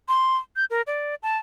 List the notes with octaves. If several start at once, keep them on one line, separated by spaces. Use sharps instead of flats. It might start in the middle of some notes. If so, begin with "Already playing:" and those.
C6
G6
A#4
D5
A5